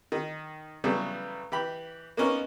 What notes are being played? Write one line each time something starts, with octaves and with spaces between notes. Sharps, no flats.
D#3
C#3 E3 F#3 G3 A3 B3
E3 G4 B5
A#3 B3 C#4 D#4 A#4